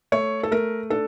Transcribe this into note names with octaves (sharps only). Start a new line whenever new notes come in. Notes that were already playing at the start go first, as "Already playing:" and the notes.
A3 C#5
A4
A3 A#4
D4 A4